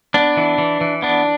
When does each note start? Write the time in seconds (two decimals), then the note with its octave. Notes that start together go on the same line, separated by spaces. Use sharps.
0.14 B3 D4
0.37 E3
0.58 E3
0.81 E3
1.02 B3 D4